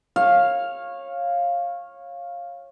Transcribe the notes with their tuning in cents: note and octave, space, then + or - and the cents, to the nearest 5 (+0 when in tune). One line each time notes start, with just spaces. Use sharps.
C#5 -20 F5 +0